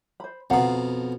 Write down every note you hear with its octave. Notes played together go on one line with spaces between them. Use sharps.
C5 B5
F2 B2 F5 F#5 A#5